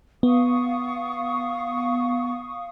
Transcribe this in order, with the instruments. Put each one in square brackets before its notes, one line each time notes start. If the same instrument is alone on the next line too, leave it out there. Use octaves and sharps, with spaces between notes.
[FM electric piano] B3 [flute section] F5 C#6 D#6